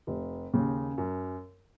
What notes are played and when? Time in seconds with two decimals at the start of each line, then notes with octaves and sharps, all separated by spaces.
0.07 F1
0.54 D#2 C#3
0.98 F#2